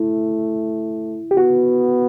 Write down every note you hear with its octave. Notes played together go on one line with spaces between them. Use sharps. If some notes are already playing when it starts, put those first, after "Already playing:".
Already playing: A3 E4
G4
B3 F#4